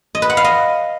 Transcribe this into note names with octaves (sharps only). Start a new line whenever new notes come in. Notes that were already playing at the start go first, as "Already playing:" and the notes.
D#5
B4
F#5
F5
D#5